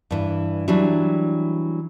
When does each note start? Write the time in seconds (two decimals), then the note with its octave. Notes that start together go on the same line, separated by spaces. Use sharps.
0.11 G2 E3
0.68 E3 F#3 G3 D4